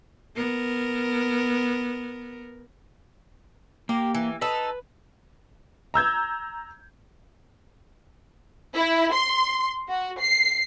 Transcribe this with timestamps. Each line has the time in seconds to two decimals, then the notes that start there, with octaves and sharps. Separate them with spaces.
0.36 B3 A#4
3.89 A#3 G4
4.15 E3
4.41 D#4 A4 B4
5.94 A#5 E6 G6 G#6
8.74 E4
9.13 C6
9.88 F#4
10.19 C7